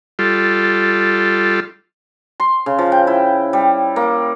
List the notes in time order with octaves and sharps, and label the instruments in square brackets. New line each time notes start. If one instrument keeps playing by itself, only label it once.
[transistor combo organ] G3 F4 A4
[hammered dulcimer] C6
C#3
F3
G5
E4
G3
A#3